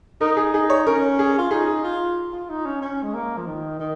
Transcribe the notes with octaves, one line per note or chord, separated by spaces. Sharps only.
D#4 A#4
G#4
D#4 G#4
C#5
C#4 A#4
G#4
F4
D#4 G#4
F4
F4
D#4
C#4
C#4
G#3
A#3
F3
D#3
D#3